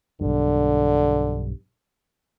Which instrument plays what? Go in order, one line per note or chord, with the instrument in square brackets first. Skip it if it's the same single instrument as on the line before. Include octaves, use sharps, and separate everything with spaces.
[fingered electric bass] B1 G2 [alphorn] D3